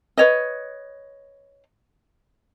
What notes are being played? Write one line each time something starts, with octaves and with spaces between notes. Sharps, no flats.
B4 C#5 D#5